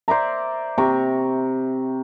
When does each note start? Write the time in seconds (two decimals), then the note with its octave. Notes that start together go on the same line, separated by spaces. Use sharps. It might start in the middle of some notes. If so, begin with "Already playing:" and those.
0.08 C5 D5 E5 A#5
0.78 C3 A#5 C#6